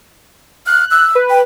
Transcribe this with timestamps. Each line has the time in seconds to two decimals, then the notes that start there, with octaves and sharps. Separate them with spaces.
0.67 F6 F#6
0.91 E6 F#6
1.15 B4
1.30 G5